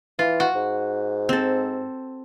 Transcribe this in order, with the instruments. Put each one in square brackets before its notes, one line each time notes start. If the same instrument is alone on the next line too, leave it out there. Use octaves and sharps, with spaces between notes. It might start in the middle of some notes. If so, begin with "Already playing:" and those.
[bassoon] E3 [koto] F4
[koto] F#4
[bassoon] G#2
[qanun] C4 A4